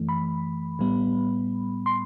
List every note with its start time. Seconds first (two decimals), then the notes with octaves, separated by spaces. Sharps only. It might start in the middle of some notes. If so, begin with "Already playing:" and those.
Already playing: F#2 E3 A3
0.09 B5
0.79 A2 G3 B3
1.86 C6